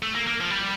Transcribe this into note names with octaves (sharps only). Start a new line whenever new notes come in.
A3
A#3
A#3
F3
G3